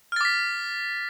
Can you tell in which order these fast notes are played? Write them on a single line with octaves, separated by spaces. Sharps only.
F6 A6 D6 B6